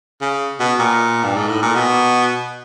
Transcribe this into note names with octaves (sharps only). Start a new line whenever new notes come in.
C#3
B2
A#2
G2
G#2
A2
A#2
B2